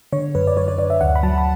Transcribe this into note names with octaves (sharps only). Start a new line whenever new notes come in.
D3 C#5
F#2 B4
D5
F#2 C#5
C#5
F#2 D5
E5
D2 F#5
B5
F#3 A5
B5